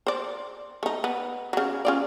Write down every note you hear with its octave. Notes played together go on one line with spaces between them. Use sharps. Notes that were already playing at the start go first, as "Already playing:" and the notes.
C5 D5
A3 D#4
B3
C#3 F#3
C#4 F4 D5